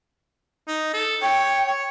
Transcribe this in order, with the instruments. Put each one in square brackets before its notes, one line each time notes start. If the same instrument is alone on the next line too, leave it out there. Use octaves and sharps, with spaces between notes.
[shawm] D#4
A4
[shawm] C#5 [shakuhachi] G5
[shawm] C#5